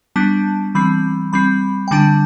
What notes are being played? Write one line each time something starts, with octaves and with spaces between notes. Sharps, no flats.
G3 B3 D4 A5
E3 G3 C4 B5
G3 C4 B5
G5
D3 G3 D4 A5